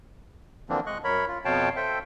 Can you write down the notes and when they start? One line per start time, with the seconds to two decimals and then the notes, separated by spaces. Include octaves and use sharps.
0.69 D3 E3 F3 A#3 C4 D4
0.86 G#3 D#5 C#6 F#6
1.04 F#2 A#4 C#5 B5
1.28 F4
1.45 F2 B2 C#5 F5 G5 A5
1.76 A4 C5 E5 G5